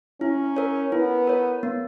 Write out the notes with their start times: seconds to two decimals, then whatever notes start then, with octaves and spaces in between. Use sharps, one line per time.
0.21 C#4 E4
0.56 A#4 C#5
0.92 B3 E4
1.27 A#4 C#5
1.63 B3